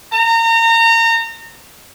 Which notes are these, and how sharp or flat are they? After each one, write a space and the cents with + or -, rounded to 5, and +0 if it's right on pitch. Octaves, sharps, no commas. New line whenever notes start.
A#5 -30